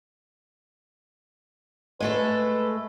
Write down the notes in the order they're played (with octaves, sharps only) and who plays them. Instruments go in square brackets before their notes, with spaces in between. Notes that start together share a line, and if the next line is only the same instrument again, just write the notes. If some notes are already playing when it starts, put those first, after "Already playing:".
[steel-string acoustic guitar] G#3 A3 A4 [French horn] B4